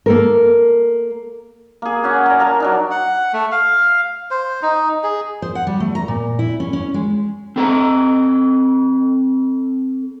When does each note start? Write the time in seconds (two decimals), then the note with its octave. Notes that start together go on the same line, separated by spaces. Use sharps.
0.06 A#3 A4 A#4
1.82 A#3 G#4
2.03 C#4 F#4
2.26 D5 A#5
2.40 A#4 F5 A5 A#5
2.60 F#3 D4 D#4
2.91 F#5
3.33 A3
3.52 F5
4.31 C5
4.62 D#4
5.03 G#4
5.42 C5
5.55 F#5
5.67 G3
5.80 A3
5.95 A#5
6.08 A#2
6.39 E4
6.60 C#4
6.73 C#4
6.94 G#3
7.56 C4 A4 A#5